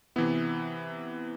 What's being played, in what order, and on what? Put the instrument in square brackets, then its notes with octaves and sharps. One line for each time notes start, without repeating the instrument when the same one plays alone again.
[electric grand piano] C3 E3 B3 E4